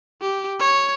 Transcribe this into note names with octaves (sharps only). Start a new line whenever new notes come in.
G4
C#5